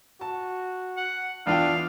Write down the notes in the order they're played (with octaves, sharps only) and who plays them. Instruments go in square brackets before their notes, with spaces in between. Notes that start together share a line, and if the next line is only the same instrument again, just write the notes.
[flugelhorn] F#4 [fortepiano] A5
[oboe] F#5
[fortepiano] E2 F4 G5 [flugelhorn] D4 [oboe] F5